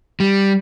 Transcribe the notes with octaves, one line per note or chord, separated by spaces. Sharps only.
G3